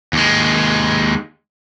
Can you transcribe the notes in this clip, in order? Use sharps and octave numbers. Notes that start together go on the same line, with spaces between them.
D#2 G#3